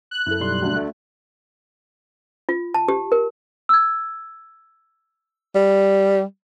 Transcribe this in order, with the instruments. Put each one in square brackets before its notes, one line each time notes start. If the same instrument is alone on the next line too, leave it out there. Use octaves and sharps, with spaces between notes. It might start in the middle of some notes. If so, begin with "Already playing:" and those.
[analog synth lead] F#6
[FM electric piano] F#2 [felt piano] E4 A4
[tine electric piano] B1 G3 C6
[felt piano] D2 D3
[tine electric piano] A3
[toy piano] F4
A5
G4
A#4
[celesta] E6 G#6
[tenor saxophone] G3